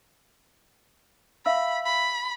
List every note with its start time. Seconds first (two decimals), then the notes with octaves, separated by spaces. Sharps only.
1.46 E5 F5 B5 E6
1.86 B5